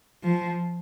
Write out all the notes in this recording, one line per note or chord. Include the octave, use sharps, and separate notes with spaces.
F3